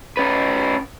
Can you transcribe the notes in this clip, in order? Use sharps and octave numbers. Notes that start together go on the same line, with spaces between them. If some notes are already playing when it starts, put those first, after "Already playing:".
C#4 B4